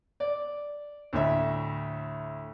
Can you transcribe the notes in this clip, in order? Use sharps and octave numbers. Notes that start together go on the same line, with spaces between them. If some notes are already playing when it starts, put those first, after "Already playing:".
D5
D2 A2 E5